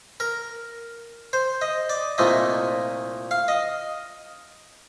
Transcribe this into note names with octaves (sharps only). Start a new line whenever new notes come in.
A#4
C5
D#5
D5
C2 A#2 F3 A3 D#5
F5
D#5